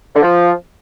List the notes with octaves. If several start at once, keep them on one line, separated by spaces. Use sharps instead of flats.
D3
F3